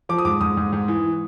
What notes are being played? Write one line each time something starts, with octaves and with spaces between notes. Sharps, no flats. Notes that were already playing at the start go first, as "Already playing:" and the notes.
F3 D6
D#6
G#2 D6
G#2 D#6
G#2
G#2
E3